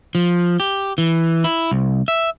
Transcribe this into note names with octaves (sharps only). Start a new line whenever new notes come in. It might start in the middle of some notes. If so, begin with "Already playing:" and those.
F3
G4
E3
E4
C2
E5